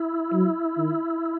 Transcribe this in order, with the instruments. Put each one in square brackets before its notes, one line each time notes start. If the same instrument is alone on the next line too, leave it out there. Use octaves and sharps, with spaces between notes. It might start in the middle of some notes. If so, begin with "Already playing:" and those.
Already playing: [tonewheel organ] E4
[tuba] F#3
D#3